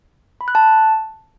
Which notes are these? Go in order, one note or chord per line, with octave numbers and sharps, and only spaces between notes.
B5
F#6
A5